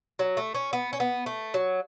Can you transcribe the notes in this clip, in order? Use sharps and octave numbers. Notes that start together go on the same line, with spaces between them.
F#3
A3
C#4
B3
C#4
B3
A3
F#3